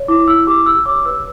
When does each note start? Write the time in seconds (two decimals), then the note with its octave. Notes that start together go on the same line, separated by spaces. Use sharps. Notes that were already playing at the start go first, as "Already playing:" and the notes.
Already playing: C#5
0.08 E4 D6
0.28 E4 E6
0.47 G4 D6
0.66 G4 E6
0.86 C#5 D6
1.05 B4 E6